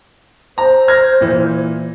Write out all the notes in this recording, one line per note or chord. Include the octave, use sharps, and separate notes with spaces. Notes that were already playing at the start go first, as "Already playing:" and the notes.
C5 A#5
F6 G#6 A#6
A#2 E3